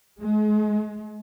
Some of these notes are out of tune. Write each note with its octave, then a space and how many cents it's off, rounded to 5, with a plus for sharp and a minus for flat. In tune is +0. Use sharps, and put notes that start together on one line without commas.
G#3 +35